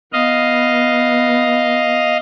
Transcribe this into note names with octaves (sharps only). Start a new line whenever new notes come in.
B3 D#5 F5